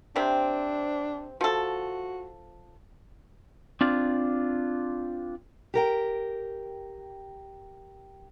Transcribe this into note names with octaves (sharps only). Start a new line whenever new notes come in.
C3 C4 D4
F3 F#4 A4
C4 D4 F4
G4 A#4 G5